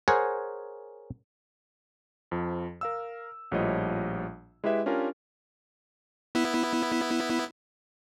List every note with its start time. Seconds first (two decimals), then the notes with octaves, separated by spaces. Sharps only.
0.08 G#4 A#4 C5 C#5 F#5 G#5
2.31 F2 F3
2.81 A#4 F5 E6
3.52 A#1 A2 F3 G3 C#5 D#5
4.64 G#3 E4 G4 B4 E5
4.86 C#4 D4 F4 G4 A#4 G#5
6.35 B3 E4